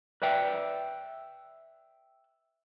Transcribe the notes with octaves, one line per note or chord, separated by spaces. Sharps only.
B4 D5 E5 G5